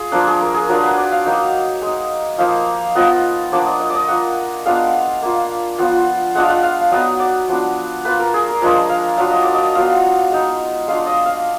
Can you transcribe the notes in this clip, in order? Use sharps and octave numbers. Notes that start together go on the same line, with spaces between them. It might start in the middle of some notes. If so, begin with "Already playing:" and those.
Already playing: F4 G#4
F3 A#3 D4 A#4
G#4
A#4
G#4
F#3 D4 F4 A#4
B4
D5
F5
F#3 A#3 D#4
G#3 D#4
F3 A#3 D#4 F5
F3 B3 F4 D#5
F3 A#3 D4 D5
D#5
D#5
D5 D#5
A#3 F4 F#5
G#3 B3 D4 F4 F5
A#3 F4
F3 B3 F4
G#3 D4 F4 F#5
F5
F#5
F5
F5
F#3 B3 D#4 D#5
D5
F3 B3 D4
A#3 F4 B4
A#4
G#4
A#4
F3 G#3 D4 F4 A#4
F5
F#3 D4 F4 F5
D#5
D5
D#5
F#3 B3 F4 F5
G#3 D#4
G#3 D4 F4 F5
D#5
F5